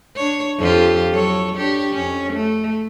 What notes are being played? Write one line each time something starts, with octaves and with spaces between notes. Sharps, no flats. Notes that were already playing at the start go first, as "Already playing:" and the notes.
D4 C#5
F2 F4 G4
F#3 A4 C#5
D4 G4 C#5
F2 C#4
A3